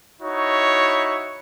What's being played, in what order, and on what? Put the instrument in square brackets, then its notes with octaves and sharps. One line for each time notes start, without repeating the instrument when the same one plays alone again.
[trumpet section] D#4 E4 F#4 C#5